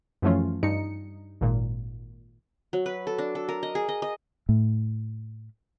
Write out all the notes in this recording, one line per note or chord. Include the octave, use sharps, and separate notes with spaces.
F#2 E3 F3 A3 C#4 F4
G2 D#4 C#7
G#1 A#2
F#3
B4
A4
D4
A4
A#4
D#5
G#4
D#5
D#5
A2